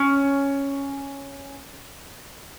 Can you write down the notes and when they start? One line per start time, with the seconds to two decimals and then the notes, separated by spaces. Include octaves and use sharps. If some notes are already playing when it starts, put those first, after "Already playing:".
Already playing: C#4